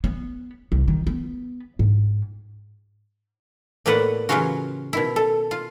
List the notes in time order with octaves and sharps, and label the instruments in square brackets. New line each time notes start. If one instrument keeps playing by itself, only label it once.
[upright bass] B3
C2
D#3
B3
G#2
[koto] A2 A#3 B3 B4 D5 F#5
C#3 E3 F#3 C#4 F4 F#4
B2 D#3 E4
A4
F4